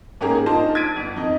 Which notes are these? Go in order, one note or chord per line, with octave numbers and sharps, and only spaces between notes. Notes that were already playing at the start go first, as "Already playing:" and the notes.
G#2 A#3 C#4 G4 G#4 A#5
D4 D#4 F4 C5 A5
G#6 A6 B6 D7 D#7
G1
F2 D#4